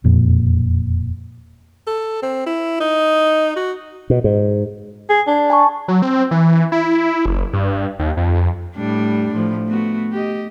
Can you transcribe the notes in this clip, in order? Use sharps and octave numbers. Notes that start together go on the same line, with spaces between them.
E1 F2 A#2
A4
C4
E4
D#4
F#4
B2
G#2
G#4
D4
G#5 A5 C#6
F#3
C4
E3
E4
F#1
G2
D#2
F2
A2 G3 D4
A2 F3
A3 B3 F#4
G4 D#5